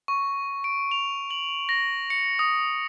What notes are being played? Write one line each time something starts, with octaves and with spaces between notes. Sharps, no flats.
C#6
D7
F7
F#7
A#6
C#7
D#6